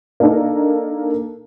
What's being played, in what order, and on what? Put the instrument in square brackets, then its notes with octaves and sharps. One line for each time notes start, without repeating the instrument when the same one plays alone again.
[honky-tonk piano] A#3 D4 D#4 A4 A#4